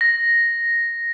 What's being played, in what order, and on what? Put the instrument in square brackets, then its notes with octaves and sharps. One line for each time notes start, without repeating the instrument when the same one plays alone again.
[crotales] A#6